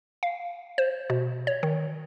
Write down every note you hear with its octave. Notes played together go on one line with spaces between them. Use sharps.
F5
C5
B2
C#5
D#3